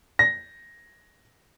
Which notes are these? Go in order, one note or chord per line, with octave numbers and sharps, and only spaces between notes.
A#6